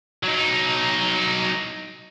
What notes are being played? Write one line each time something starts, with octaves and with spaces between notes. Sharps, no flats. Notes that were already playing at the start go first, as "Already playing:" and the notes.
F#3 D#4